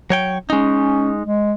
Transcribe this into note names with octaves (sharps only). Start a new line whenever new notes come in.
F#3 C#5 G5
G#3 C#4 D#4
G#3